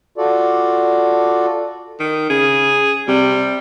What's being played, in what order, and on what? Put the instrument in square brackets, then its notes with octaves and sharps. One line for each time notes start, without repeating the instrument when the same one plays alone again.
[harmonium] F4 F#4 A4 D5
[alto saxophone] D#3
[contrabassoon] C#3 [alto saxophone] G#4
[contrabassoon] C3 [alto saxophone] G3